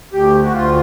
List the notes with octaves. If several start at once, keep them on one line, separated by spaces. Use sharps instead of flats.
D2 G4
F#4
D2 F4